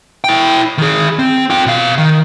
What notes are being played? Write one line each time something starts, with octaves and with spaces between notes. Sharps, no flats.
E4 G5
D#3 G#4
C4
F4 G5
B2 F5
D#3